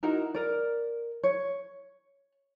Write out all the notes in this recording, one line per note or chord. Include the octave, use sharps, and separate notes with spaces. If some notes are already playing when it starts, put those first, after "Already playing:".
D#4 E4 F#4 A#4
A#4 D5
C#5